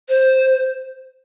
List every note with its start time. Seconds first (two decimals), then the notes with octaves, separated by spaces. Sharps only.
0.09 C5